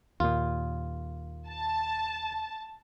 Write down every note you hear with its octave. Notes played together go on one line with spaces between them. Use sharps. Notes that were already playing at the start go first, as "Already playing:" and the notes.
D#2 A#2 F4
A5